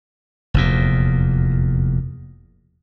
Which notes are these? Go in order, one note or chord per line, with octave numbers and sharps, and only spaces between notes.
F1 E2 A#2